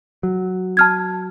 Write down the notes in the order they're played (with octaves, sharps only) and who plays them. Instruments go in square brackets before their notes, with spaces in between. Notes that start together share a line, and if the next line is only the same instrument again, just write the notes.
[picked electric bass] F#3
[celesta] A5 F6 G#6